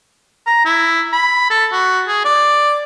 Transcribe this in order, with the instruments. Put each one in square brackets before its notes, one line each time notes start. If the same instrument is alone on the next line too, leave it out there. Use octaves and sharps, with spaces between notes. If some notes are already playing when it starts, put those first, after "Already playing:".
[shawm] A#5
E4
B5
A4
F#4
G#4
D5